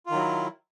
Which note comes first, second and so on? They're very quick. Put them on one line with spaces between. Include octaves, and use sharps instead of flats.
F4 D#3 F#3 E4